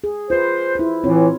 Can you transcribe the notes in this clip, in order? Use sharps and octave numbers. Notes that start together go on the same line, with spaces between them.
G#4
F4 B4 C5
E4 C5
A2 E3 C4 F4 C#5